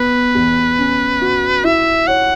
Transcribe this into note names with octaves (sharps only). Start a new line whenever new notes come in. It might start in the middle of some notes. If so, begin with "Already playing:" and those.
Already playing: B3 B4
E2
C#4
F#4
E4 E5
C#5 F#5